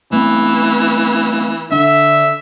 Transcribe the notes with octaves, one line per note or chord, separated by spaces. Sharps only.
E3 A3 B3 C4
D3 D4 E5